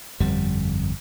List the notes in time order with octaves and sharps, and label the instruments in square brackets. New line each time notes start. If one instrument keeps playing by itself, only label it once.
[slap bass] G1 F2 G3